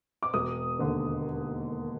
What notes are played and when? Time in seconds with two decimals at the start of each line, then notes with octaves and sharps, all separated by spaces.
0.23 D6
0.34 E1 D#6
0.79 D#2 D3